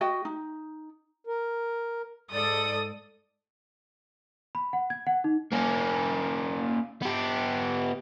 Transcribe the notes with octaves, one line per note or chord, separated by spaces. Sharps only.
F#4 D#5 G5
D#4
A#4
G#2 A4 D5 D#6
B5
F#5
G#6
F#5
D#4
A#3 C#4
B3 G4